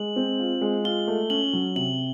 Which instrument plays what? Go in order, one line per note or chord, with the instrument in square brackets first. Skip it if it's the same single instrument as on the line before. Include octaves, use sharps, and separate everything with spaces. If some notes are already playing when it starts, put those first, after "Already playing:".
Already playing: [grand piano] G#3 [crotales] F#7
[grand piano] C4
F4
G#3
[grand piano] F4 [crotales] G7
[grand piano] A3
[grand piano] C#4 [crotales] F#7
[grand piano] F#3
[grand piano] C3 [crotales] F#7